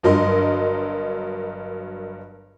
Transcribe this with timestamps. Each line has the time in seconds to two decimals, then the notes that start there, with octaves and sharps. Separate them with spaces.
0.03 G1 G2 F#3 A#4 D#5 C6